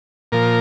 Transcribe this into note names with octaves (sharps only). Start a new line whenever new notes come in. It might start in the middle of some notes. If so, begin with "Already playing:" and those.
A#2 F3 A#4